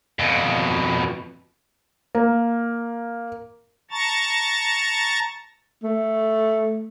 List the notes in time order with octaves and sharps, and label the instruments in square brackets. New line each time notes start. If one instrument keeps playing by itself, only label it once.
[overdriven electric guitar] F2 B2
[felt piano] A#3
[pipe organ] A5 A#5 C#6 A6
[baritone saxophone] A3